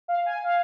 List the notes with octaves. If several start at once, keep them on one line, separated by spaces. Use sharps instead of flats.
F5
G#5
F5